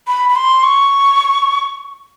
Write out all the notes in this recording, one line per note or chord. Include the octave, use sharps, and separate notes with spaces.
B5
B5
C6
C#6